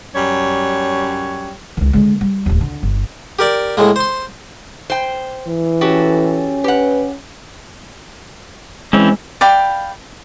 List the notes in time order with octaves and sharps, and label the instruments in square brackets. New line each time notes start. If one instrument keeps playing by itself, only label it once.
[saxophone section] F#2 G3 C#5
[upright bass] C#2 D#3
D3 G#3
G3
D1 D#2
D3
G1
[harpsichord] G4 A#4 D5
A2 G#3 A#3
C5 C6
[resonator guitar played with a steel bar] C5 G5
[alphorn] E3
[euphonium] C#4 [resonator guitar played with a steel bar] F#4 G4 A4
[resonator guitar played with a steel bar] G4 F#5 [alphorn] B4
[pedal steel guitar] E3 C4 C#4 [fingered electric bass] G#3
[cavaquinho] D5 F5 G5 B5